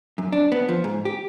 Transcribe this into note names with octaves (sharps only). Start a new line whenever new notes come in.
F#2
D4
B3
F3
G#2
G4